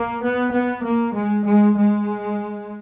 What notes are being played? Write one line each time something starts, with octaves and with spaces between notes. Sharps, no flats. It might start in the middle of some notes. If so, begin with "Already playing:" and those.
Already playing: A#3
B3
B3
A#3
G#3
G#3
G#3